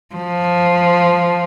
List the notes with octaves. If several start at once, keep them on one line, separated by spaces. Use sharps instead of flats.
F3